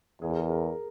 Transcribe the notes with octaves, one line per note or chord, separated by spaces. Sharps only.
E2 G#4
A#4
G#4
A#4